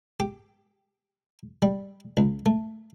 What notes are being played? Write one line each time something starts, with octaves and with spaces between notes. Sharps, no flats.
G4
G3
C#2
A3